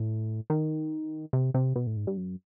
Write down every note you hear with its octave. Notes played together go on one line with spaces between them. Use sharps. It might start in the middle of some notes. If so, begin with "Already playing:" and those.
Already playing: A2
D#3
C3
C3
B2
A2
G#2
G2
F#2